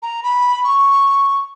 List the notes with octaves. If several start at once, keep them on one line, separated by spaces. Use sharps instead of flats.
A#5
B5
C#6